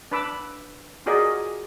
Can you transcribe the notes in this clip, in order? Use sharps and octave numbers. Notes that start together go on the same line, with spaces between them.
D4 B4 B5 D6 E6
F4 F#4 G#4 A#4 D5 D#5